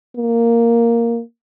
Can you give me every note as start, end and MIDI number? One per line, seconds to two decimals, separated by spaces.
0.16 1.20 58